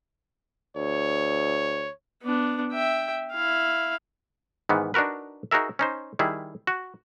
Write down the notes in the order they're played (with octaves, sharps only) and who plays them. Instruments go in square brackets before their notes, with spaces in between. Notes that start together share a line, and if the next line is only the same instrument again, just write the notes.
[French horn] D2 [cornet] C#5
[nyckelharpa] B3 D4
E5 G5
E4 F5
[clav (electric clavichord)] G#2 D#3 E3 B3
D4 D#4 F#4 A#4 B4
D#4 F#4 G#4 A#4 E5
C#4 D#4 C5
D#3 G3 E4 G#4
F#4